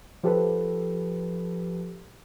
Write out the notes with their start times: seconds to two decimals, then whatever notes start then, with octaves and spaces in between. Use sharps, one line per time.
0.23 F3 G4 A4 B4